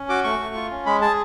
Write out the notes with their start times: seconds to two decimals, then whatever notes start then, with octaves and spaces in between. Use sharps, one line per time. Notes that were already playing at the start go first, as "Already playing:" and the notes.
Already playing: C#4
0.09 F#4 D6
0.24 A3 C#6
0.39 A3
0.55 F4
0.71 C#4
0.86 G#3 B5
1.01 G#4 A5